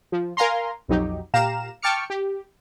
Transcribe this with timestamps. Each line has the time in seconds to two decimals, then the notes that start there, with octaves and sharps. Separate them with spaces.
0.12 F3
0.37 A#4 F5 G#5 A#5 C6
0.88 B1 F2 F#3 D#4 G4
1.34 A#2 G4 F5 A#5 E7
1.82 G5 A5 C#6 D6 F6 C#7
2.10 G4